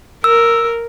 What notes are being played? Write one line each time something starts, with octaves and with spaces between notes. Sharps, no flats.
A#4 E6